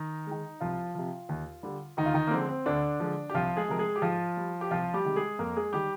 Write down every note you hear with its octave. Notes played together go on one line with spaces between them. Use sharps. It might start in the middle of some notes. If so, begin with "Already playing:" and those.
Already playing: D#3 D#4
G#3
D#3
C2 F3 F4
C3 F3
D#2
D3 G3
D2 D#3 D#4
F4
D#3 D#4
A#3
D3 F3 G#3 C4
C4
D2 D3 D4
D3 F3 G#3
G4
C2 F3 F4
G#3 G#4
C3 F3 G#3 A#4
G#3 G#4
G4
G#2 F3 F4
G3
G4
C2 F3 F4
G3 G4
C3 D#3 G#3
G#3 G#4
F2 A#3 A#4
G#3 G#4
D#3 G3 G4